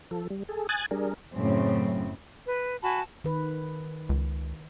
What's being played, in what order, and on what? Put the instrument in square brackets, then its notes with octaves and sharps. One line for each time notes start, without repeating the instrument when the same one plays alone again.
[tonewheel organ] F3 A4
G3
G#4 A4
G#5 D#6 F#6 G#6 A6
G3 D4 G#4 A#4
[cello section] F#2 A2 C#3 C4
[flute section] B4
F#4 G#5 A5 B5
[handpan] D#3 B4
[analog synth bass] C#2